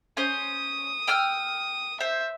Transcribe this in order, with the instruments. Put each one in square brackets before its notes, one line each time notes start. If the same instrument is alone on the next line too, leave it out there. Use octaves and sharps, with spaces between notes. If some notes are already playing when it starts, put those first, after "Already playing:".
[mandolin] C#4 C5 [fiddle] D#6
[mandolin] G5 E6 F6
[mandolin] C5 [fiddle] E5